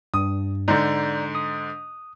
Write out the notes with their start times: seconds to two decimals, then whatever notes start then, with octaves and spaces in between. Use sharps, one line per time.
0.14 G2 D#6
0.68 G#2 D3 D5 A#5 G6
1.35 D#6